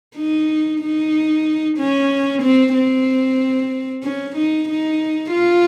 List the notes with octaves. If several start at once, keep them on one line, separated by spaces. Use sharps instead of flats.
D#4
D#4
C#4
C4
C4
C#4
D#4
D#4
F4